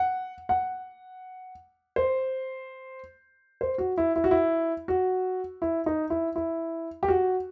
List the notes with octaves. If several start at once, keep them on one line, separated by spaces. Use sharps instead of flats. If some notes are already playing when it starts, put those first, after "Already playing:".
Already playing: F#5
F#5
C5
C5
F#4
E4
E4
F#4
E4
F#4
E4
D#4
E4
E4
G4
F#4